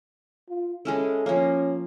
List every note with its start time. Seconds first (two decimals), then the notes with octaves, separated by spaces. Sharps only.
0.49 F4
0.85 G#3 C#4 E4 A4
1.26 F3 A#3 C#4